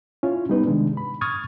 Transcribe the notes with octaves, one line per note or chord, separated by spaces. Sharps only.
C#4 E4 F4
G3 B3 D#4 B4
C3 D#3 G#3 D4
B5
C#6 D#6 F6 G#6 A6